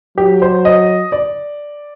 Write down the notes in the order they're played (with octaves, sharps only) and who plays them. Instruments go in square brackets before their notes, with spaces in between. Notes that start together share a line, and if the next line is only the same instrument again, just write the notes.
[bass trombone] F#3 [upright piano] G4
[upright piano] C5
D#5
D5